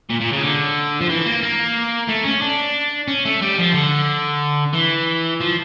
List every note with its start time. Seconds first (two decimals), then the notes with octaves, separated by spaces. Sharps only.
0.10 A#2
0.21 A#2
0.33 C#3
0.43 D3
1.01 F3
1.09 E3
1.26 A#3
1.43 A#3
2.08 A3
2.25 C#4
2.42 D4
3.08 C#4
3.25 A3
3.42 G3
3.58 F3
3.74 D3
4.73 E3
5.40 F3